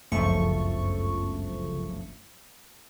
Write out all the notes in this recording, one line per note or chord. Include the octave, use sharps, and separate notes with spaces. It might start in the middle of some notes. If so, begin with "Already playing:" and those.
G1 C#2 F#2 F3 A3 C#6